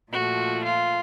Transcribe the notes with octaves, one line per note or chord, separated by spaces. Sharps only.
A#2 F3 A3 F#4
F4